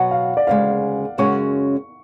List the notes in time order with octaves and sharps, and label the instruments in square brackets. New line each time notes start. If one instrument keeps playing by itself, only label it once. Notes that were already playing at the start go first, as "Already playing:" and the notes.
Already playing: [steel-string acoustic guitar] B2 F#3 B3 F#4 [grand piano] F#5
[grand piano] F5
D5
[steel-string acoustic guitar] D2 C#3 G#3 [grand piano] F5
[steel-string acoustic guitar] F#2 C#3 G#3 C#4 F#4 [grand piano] C#6